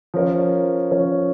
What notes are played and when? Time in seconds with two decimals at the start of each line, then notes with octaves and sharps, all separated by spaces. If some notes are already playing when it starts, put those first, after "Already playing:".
0.14 F3 C#4 A#4 C#5
0.91 F3 C#4 A#4 C#5